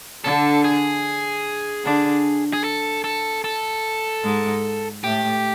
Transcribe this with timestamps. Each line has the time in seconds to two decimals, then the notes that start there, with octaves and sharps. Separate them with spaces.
0.24 D3 D4 A4
0.64 G#4
1.84 D3 D4
2.53 G#4
2.64 A4
3.04 A4
3.44 A4
4.24 G#2 G#3
5.04 A2 A3 G4